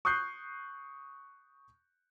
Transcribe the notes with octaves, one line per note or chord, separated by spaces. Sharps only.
C#6 D#6 F#6 G6 C7